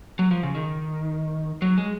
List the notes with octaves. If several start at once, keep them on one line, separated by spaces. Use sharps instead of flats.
F#3
F3
C#3
D#3
F#3
G#3